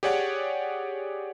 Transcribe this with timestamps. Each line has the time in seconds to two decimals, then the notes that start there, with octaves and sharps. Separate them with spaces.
0.03 G4 G#4 C#5 D5 F#5